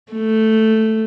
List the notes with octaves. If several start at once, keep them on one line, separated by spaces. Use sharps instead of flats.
A3